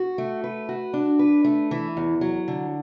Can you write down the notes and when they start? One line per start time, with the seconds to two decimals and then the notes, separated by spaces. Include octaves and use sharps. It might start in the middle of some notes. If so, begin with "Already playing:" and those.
Already playing: F#4
0.18 A3
0.44 B4
0.69 F#4
0.93 D4
1.19 B4
1.44 A3
1.71 E3
1.97 E2
2.21 F#3
2.48 D3